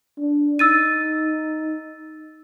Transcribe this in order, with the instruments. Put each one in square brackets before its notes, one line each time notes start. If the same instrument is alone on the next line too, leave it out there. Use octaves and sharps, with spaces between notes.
[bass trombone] D4
[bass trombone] D#4 [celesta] E6 A6 D#7